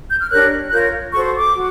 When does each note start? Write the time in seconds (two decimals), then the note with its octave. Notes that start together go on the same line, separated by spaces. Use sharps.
0.10 G6
0.21 F6
0.31 D4 G4 A#4 C#5 F#6
0.68 F#6
0.72 F4 A#4 C#5 G6
1.13 F#4 A4 C5 C#6
1.35 D6
1.55 F#4